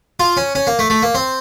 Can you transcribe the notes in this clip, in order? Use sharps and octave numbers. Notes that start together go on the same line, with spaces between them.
F4
C#4
C#4
A#3
A3
A3
A#3
C4